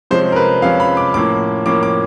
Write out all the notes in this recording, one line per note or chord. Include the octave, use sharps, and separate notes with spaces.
C3 F3 G#3 C#4 C5
A#4
B4
C3 F3 G#3 C#4 F5
B5
D6
A2 F3 A#3 C#4 D6
A2 F3 A#3 C#4 D6
D6